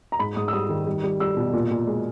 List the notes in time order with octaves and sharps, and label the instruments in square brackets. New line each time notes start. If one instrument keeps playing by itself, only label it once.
[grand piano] A#5
G#2 B5
G#2 D#6
E6
G3 D#6
D#3
G3
G3
G3 E6
B2
A#2
A#2
G#3